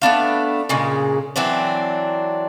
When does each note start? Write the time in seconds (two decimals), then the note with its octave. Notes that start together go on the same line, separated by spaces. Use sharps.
0.02 A3 B3 D4 F5
0.69 A#2 C#3 G#3
1.36 E3 F#3 C4 D4